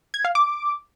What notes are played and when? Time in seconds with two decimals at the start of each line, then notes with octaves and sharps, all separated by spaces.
0.14 G#6
0.25 F5
0.35 D6